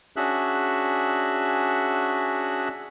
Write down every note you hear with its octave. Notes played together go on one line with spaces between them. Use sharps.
C#4 D4 F#4 G#4 E5 F#6